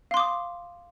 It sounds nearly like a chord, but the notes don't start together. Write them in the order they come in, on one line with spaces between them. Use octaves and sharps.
F5 C6 D6 D#6